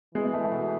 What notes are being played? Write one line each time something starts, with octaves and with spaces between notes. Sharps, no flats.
E3 G#3 G#4
G#3
A3
A3
B2 B3